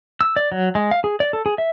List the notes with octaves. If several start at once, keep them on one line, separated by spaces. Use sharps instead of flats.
E6
D5
F#3
G#3
F5
G#4
D5
A4
G#4
E5